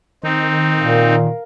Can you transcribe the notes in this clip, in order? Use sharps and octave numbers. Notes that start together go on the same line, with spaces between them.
D#3 C4 D#4
A#2 A#4 F5